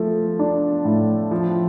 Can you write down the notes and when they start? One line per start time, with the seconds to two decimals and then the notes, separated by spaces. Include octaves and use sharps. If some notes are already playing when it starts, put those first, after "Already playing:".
Already playing: F3 A3
0.39 D4
0.85 A2
1.31 F3